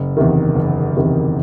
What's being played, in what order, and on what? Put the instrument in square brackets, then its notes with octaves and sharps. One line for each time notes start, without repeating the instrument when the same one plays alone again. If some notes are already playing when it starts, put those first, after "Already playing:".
Already playing: [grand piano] F#1
E2 C3 D#3
F#1
E2 C3 D#3